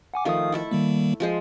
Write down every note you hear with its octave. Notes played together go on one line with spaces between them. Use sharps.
F#5 G#5 D6
D#3 F3 A3 F5 D#6
E4 A4 E5
D#3 G3 A#3
F3 G#3 C5